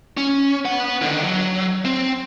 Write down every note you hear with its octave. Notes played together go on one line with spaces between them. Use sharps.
C#4
B3 F#5
D3 D#3
F#3
C4